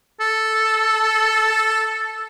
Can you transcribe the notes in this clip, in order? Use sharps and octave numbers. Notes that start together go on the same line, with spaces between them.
A4